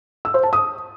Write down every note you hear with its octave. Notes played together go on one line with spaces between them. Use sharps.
E6
C5
A5
D#6